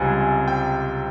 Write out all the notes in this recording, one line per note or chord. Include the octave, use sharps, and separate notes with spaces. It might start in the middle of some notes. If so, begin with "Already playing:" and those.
Already playing: C#2 C3 G3 G#5
G5